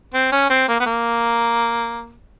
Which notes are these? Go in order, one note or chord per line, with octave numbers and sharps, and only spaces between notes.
C4
C#4
C4
A#3
B3
A#3